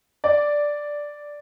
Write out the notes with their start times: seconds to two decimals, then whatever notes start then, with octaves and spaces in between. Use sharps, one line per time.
0.24 D5